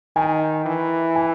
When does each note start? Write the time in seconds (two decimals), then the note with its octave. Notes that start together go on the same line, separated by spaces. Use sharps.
0.16 D#3 G#5
0.65 E3
1.16 G#5